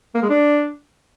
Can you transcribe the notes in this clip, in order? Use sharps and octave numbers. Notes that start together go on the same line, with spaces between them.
A#3
G#3
D4